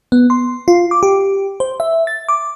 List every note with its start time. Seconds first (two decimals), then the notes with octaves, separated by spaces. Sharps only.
0.12 B3
0.30 C6
0.68 F4
0.91 D6
1.03 G4
1.60 C5
1.80 E5
2.07 A6
2.29 D6